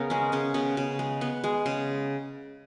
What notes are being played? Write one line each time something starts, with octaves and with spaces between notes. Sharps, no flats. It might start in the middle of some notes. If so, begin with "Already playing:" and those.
Already playing: C#3 B3 A#4
G#3 C#4
C#3 C#4
C#3 B3
C#3
G#3
B3
G#3
C#3